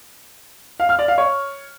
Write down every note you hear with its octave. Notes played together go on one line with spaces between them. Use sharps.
F5
F6
D5
F5
C#5